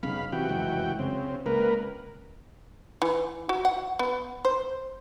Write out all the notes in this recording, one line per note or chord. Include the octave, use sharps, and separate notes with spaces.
F1 B1 C#3 F5 B5
C3 E3 F#4 G5
F1 C#2 F#2
C#3 C4
C#2 A#3 A#4 B4
E3
F#4
F#5
B3
C5